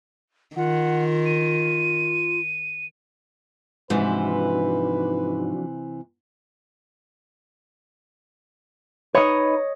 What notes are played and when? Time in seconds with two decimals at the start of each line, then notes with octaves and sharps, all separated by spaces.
0.56 D#3 F4 F#5
1.26 D#7
3.90 G#2 C3 E3 F3 D4 F#4 B4
9.15 D#4 B4 C#5 D#5